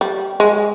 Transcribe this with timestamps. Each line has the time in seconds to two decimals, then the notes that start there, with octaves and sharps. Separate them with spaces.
0.01 G3
0.40 G#3